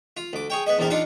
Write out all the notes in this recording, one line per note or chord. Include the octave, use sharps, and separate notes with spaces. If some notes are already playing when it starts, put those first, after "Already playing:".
F4
D2 D6
G#4 C#5 G5
B3 G#4 D#5
A#1 E2 A#2 C4 A#4
D4 D#4 F4 F5 F#5 A#5